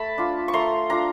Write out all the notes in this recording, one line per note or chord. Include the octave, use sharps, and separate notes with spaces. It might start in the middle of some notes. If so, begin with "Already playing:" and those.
Already playing: A3 A5 B5
D4 F4
C#6
A3 A#5 C6
D4 F4 A#5